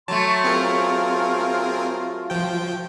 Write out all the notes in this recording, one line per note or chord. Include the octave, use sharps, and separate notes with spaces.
F#3 A3 A5 C6
C4 F4 G#4 A#4
F3 G5